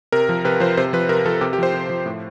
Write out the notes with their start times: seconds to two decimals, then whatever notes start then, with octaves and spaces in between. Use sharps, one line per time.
0.12 C3 A#4
0.29 F3
0.45 C3 B4
0.60 F3 C5
0.77 C3 C5
0.93 F3 B4
1.09 C3 A#4
1.26 F3 A4
1.41 C3 G4
1.53 G4
1.58 F3 C5
1.74 C3
1.90 F3
2.06 A2